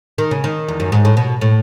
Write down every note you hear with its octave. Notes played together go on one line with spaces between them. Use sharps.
D#3
C#3
D#3
E2
F#2
G#2
A2
B2
A2